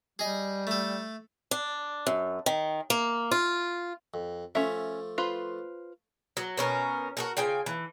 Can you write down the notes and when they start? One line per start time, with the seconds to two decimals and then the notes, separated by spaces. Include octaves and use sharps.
0.19 G3 G#4 D#5
0.67 A3 A4
1.51 D4
2.07 F#2
2.46 D#3
2.90 A#3
3.31 F4
4.14 F2
4.55 F3 A3 C#4 E5
5.18 F4 B4 C5
6.37 F#3
6.57 B2 C#4 A#4
7.17 F#4 G#4 A#4
7.37 C#3 F4 G5 G#5
7.66 E3